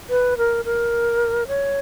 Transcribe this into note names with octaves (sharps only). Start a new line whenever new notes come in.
B4
A#4
A#4
C#5